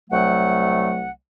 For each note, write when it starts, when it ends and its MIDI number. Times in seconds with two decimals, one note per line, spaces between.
0.10 1.09 36
0.10 1.09 54
0.10 1.09 57
0.10 1.09 78